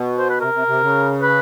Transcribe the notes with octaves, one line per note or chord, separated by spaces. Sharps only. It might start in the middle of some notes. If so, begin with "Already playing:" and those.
Already playing: B2
C5
B4
C3 A#4
C3
C3
C#3
B4